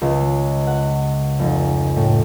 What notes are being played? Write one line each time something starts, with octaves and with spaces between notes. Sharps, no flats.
C#2
F#5
F1
A2